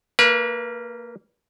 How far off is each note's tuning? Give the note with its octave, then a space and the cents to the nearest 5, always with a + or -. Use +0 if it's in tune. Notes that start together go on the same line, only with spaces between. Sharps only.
A#3 -15 B4 -35 F5 -45